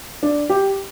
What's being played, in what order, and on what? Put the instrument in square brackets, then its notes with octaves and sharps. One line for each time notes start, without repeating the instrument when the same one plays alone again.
[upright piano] D4
G4